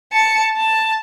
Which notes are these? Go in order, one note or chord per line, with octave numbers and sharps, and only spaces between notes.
A5 C#7
A5